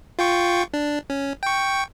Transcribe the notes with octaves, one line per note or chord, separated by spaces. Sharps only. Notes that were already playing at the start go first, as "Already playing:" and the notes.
F4 G5 C#6
D4
C#4
G5 C#6